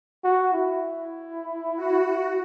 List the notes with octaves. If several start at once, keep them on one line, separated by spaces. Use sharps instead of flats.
F#4
E4
F#4